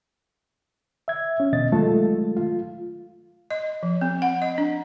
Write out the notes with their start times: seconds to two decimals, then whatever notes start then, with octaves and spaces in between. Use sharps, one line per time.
1.08 E5 G#6
1.40 C#4
1.53 E2 B2 D3 D#5 A6
1.72 D#3 F#3 G#3 A3 F4 A4
2.37 F4
3.51 D#5
3.83 F3
4.01 C4
4.22 F#5
4.42 D#5
4.58 D4